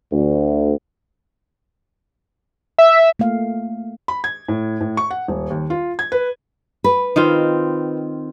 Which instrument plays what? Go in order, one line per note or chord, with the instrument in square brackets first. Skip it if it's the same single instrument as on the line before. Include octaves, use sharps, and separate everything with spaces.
[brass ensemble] D2
[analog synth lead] E5
[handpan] A3 A#3 F5
[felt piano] B5
G#6
A2
A2
C#6
F#5
D#1
D#2
F4
G#6
B4
[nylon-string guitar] B4
[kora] D#3 C4 F4